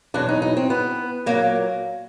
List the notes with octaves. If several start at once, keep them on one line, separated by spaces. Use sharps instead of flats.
E2 B2 F#3 D4
D#4
D#4
C4
B3
A#2 F#3 A#3